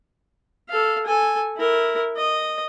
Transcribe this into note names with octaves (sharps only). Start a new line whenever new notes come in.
A4 F5
A4 G#5
E4 A#4
D#5